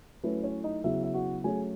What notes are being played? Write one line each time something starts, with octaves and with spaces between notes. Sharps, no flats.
F#3 A3 C#4 E4 B4
C#4 C#5
D#4 D#5
C#3 F#3 B3 E4 E5
E5
F#4 F#5
F#3 A3 C#4 G#4 G#5